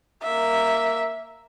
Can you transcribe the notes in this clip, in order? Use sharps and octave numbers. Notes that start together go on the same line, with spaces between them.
A#3 E5